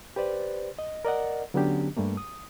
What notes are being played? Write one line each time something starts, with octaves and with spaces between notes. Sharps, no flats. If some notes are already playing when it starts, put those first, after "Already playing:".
G4 B4 C5 D5
D#5
A#4 D5 D#5 F#5
D3 F#3 B3 C#4 D4 G4
G2 G3 A3 A#3
D#6